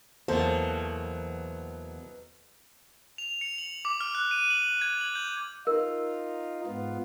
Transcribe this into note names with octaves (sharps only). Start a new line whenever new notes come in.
E2 B2 F#3 A#3 A4 C5
F7
C#7
F#7
D6
F6
F#6
D#7
F#7
G#6
F#7
G6
D#4 F4 A#4
G#2 B3 F4